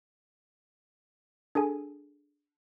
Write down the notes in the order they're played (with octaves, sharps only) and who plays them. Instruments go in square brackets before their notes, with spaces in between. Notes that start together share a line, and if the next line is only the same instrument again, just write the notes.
[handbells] D4 G#4 A4 G#5